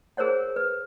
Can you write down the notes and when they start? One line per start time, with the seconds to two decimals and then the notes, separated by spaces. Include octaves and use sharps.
0.17 G#4 A#4 C5 C#5 F#5
0.56 B4